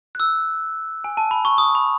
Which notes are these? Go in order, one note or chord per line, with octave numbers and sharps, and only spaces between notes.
F#6
E6
G#5
A5
B5
C#6
D#6
B5